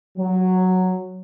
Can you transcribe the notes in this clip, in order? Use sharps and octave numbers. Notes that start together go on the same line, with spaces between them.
F#3